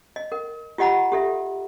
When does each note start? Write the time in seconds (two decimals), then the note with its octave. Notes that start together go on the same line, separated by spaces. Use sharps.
0.16 D#5
0.32 A#4
0.78 F4 G4 D#5 F#5 A#5 B5
1.12 G4 A4 E5